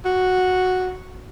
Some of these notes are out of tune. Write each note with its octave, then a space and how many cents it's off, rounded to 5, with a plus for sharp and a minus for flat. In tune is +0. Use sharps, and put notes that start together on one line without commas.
F#4 -5